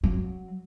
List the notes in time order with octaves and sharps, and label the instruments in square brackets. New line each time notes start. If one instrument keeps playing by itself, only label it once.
[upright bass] F#3